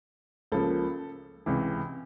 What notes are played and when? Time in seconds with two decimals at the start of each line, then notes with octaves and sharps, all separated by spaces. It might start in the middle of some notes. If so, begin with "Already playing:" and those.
0.52 C#2 C#3 F3 A#3 A4
1.46 C#2 C3 E3